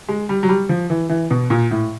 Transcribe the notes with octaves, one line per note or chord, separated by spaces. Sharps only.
G#3
G3
F#3
G3
F3
E3
E3
B2
A#2
A2